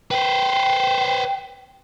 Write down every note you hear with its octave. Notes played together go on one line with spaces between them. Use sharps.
B4 C5 G5